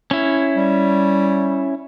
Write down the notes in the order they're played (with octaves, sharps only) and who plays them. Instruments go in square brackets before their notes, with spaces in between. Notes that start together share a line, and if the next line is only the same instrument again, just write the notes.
[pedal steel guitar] C#4 E4
[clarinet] G3